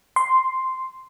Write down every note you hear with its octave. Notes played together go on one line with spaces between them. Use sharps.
C6